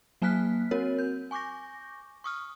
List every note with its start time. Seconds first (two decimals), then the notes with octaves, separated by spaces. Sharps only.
0.22 F#3 A#3 G#5 F6 F#6 B6
0.71 C4 F#4 A#4 C#5
0.99 G6
1.31 G#5 C#6 D6 G6 A#6
2.24 C#6 D#6 F6